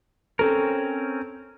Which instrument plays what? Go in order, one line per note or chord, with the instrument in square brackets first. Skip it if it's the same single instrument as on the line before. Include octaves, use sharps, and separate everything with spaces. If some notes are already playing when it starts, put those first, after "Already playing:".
[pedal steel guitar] C4 C#4 A#4 [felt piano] A4